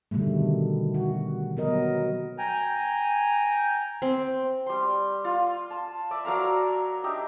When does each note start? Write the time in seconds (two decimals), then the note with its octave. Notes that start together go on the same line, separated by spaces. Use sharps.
0.11 B2 D3 D#3 G3 A3
0.94 F#4
1.57 F#3 B3 A#4 D#5
2.38 G5 G#5 A#5
4.02 C4
4.66 G3 C6
5.24 F4
5.70 A5
6.11 D5 E5
6.25 F#3 A#4 F5 A#5
7.03 D4 D#4 G4 E5